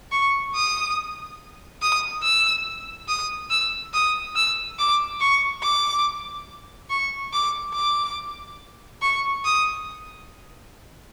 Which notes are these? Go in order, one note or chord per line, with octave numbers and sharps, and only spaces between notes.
C#6
D#6
D#6
E6
D#6
E6
D#6
E6
D6
C#6
D6
C#6
D6
D6
C#6
D#6